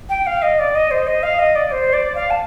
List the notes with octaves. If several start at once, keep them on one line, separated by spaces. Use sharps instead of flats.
G5
F5
D#5
D5
D#5
C5
D#5
F5
D#5
D5
C5
D5
F5
A5